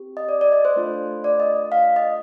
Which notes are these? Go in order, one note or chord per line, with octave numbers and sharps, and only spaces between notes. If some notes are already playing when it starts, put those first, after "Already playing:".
Already playing: C4 G4
D#5
D5
D5
D#5
C5
A3 D4 F4 A4
D5
D#5
F5
D#5